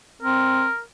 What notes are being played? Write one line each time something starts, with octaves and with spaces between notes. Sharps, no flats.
C4 A#4